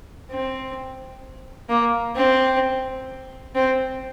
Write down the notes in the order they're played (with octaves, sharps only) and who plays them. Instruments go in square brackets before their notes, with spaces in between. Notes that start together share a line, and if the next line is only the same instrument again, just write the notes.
[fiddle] C4
A#3
C4
C4